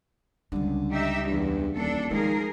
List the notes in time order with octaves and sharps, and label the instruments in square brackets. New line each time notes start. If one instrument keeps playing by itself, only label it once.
[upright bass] C#2 G3 [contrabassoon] D3
[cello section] D#4 G4 E5
[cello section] E2 [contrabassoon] G2
[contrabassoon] D#1 [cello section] D4 A4
[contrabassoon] D#3 [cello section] F3 G#4 A#4 [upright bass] G#3